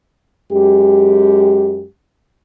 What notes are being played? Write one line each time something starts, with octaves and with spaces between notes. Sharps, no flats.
F#2 G#3 G4